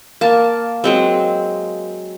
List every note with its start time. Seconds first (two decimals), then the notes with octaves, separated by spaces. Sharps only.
0.21 A#3 A5
0.84 F#3 G#3 C4